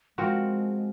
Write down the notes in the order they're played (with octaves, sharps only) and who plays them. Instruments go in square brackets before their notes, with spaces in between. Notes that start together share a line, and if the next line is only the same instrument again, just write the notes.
[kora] F3 C4 F#4 A#4 [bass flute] G#3